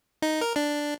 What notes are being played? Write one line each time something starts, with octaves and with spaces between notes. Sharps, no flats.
D#4
A#4
D4